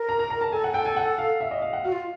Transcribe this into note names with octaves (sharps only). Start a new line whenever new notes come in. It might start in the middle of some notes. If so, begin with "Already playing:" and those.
Already playing: A#4
A#5
A#5
A#5
A5
A4 G#5
F#5
G5
G#5
F#5
F5
E5
D#5
F5
F#5
F#4 F5
F4